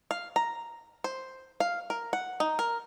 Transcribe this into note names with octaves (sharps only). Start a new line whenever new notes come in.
F5
A#5
C5
F5
A#4
F#5
D#4
A#4